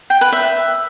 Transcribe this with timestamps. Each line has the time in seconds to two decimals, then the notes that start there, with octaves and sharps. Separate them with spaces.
0.10 G5
0.21 B4
0.32 E5